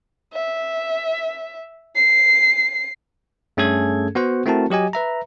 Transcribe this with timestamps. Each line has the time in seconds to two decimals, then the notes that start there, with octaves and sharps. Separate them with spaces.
0.33 E5
1.95 C7
3.57 G2 A3 C#4 G#4 A4 G#6
4.15 B3 F#4 C5 F#5
4.46 A3 C4 E4 F#4 A#4 A5
4.70 F#3 G4 D#5 G#5
4.93 B4 E5 A#5